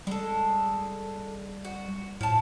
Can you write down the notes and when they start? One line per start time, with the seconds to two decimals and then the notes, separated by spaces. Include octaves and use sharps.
0.07 G3 G#3 A4
1.65 F#4
2.21 A2 F3 A5